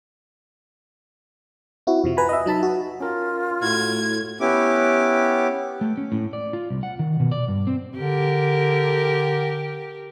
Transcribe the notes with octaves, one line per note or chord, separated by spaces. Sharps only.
C4 E4 F#4
F2 C3 F3
B4 G#5 A#5 B5
D#5 E5
F#3 D#4 A5 B5
F#4
C#4 F4 A#4
A2 E4 F#4 G#6
B3 C#4 E4 G4 D6
A3
C#4
A2
D5
F4
C2
F#5
D#3
B2
D5
G2
C4
D3 G4 A#4